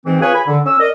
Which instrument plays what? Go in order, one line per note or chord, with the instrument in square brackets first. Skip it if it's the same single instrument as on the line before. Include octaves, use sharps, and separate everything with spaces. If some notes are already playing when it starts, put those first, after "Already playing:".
[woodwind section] G#2 E3 C4
F4 G#4 B4 C#5 G#5
G#5 B5
D3
C#4 E6
A#4 D5 D#5